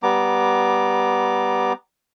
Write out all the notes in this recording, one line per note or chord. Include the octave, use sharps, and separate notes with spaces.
G3 B3 A#5 D6